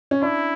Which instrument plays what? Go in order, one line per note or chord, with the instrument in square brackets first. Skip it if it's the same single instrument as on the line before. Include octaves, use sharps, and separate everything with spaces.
[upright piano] C#4
[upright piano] D4 [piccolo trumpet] E4